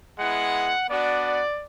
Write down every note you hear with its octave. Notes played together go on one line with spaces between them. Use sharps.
G#3 B3 E4 F#5
B3 D4 F#4 D5